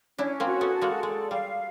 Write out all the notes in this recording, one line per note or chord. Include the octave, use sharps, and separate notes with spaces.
C#4 D4 E4
A#3 C4
F#4
A3 B3
A4
G#3 A#3
G#3 D5
G3 F5